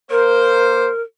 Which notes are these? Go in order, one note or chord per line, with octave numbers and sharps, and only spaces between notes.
A#3 A#4 C5